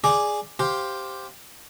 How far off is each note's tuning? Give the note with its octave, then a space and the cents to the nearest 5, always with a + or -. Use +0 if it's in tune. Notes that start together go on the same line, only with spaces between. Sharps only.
G#4 +0 D5 +0 D6 +0
G4 +0 C5 +0 F5 +10